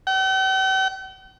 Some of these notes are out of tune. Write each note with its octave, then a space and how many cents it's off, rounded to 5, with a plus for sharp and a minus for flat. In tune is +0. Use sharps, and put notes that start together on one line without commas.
G5 -45